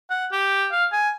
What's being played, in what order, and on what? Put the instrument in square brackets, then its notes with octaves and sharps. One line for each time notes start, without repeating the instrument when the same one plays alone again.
[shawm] F#5
G4
F5
G#5